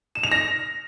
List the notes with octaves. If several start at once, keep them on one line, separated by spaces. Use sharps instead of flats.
E7
F7
A#6